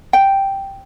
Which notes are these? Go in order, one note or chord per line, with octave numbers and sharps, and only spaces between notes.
G5